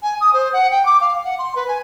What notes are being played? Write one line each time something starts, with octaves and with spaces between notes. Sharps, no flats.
G#5
D#6
C5
F#5
G5
D6
F5
F#5
C6
B4
G#5